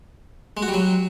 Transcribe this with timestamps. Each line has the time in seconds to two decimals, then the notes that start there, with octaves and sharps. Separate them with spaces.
0.57 G#3
0.62 F#4
0.68 G3
0.74 F#3